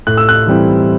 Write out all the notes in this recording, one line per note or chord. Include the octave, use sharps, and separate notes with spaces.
A2 F#6
E6
F#6
E3 G3 C4 E4